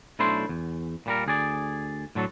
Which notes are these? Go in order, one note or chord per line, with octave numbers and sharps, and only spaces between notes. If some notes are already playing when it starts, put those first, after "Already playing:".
B1 A3 D4 E4 C5 C6
E2
A#2 G3 A#4
D2 G#4 D5
A2 D3 F#3 A4